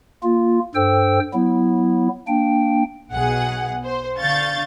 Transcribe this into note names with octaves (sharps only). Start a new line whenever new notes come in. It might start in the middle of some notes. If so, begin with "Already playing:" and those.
A#3 F4
G2 A4 C5 G5 E6
F#3 B3 E4
A#3 D4 G5
B1 B2 G#4 F#5
C5
D3 F5 C#6 G6 A6